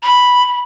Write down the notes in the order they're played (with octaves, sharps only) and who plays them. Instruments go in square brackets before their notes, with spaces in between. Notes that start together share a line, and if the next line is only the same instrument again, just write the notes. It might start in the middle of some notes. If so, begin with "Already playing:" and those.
[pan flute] B5